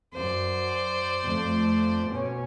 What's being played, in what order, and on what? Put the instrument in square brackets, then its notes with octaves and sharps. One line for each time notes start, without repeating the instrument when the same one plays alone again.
[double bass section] F#2 [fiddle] C5 D5
[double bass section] F2 A3
B2 C#4